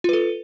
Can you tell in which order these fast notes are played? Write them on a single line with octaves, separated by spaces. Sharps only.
F4 B4 A4